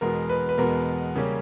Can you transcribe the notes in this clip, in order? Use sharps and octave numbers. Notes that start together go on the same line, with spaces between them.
E2 B2 G#3 B3 A#4
B4
B4
E2 B2 G#3 B3 A#4
C#3 G3 A#3 C#4